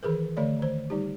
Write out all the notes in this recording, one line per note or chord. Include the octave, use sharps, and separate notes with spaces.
D#3 E3 G#4 A#4 B4
D3 A3 C#5 D5
D#3 C5
G3 D#4 G4